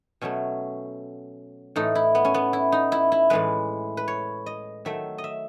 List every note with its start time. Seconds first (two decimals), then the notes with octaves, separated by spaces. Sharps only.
0.21 B2 F#3 A3 C#4
1.76 A2 E3 A3 D#4
1.95 E4
2.15 B3
2.25 C#4
2.34 B3
2.53 E4
2.72 D#4
2.92 E4
3.12 E4
3.30 A2 E3 G#3 B4
3.97 B4
4.08 C#5
4.46 D#5
4.85 D#3 F#3 A3 E5
5.18 D#5
5.24 E5